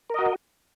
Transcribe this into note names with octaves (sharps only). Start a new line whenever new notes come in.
F#4 A#4 D#5